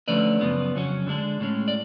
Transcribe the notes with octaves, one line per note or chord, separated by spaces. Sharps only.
D3 F3 A3 C#4 B4 D5
F#2 C#3 F3 B3
F2 C#3 F#3 C#4
D3 G#3 D4
A2 G#3 C#4
D5